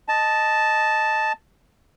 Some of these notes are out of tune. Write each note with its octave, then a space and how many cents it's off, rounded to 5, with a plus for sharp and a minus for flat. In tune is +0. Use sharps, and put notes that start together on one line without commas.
D#5 +0 A5 -5